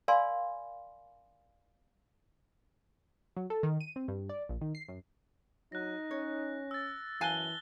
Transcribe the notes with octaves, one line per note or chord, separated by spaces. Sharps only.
A#4 D5 F5 G#5 B5 C6
F#3
A4
D#3
D#7
C4
G2
D5
A#1
D#3
C7
F#2
F#3 D#4 F#6 A#6
C#4 C#5
E6 A6
F#2 E3 F5 G#5 A5 E6 F#6 G7